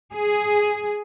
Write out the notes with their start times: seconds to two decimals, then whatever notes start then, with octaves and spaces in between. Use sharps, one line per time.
0.13 G#4